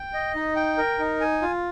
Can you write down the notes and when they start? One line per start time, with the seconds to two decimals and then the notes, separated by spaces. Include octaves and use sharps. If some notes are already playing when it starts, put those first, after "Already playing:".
Already playing: G5
0.14 D#5
0.35 D#4
0.56 G5
0.78 A#4
0.99 D#4
1.21 G#5
1.42 F4